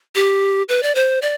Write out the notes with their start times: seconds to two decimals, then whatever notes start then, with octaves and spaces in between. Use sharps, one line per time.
0.15 G4
0.69 B4
0.83 D5
0.95 C5
1.22 D5